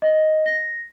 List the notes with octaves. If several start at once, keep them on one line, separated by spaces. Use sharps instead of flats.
D#5
A#6